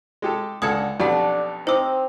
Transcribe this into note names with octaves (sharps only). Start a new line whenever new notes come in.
G#3 G4 A4
C#2 D3 A4 F#5 D#6 G#6 C#7
B1 F2 D4 G4 D5 F#5
C4 D#4 C5 D6 E6